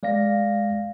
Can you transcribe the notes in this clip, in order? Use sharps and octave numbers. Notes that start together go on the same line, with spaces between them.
G#3 D5 F5 A#6